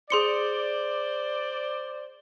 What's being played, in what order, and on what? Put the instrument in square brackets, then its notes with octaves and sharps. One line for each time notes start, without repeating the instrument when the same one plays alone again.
[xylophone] G#4 C6 C#7 [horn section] C5 D5